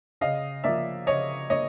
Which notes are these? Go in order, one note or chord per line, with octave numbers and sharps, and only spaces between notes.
C#3 D#5 F5
F3 A#3 D5 E5
C#3 C#5 D#5
A#3 C#5 D#5